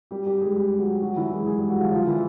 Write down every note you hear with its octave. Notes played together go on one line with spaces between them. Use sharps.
G3 G4
G3 G4
G#3 G#4
G3 G4
F#3 F#4
F#3 F#4
E3 E4
G#3 G#4
G#3 G#4
G3 G4
F#3 F#4
F3 F4
F3 F4
E3 E4